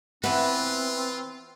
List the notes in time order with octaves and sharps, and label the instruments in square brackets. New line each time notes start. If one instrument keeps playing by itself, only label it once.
[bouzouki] E3 B4 [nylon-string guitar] B3 [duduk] C4 [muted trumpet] F4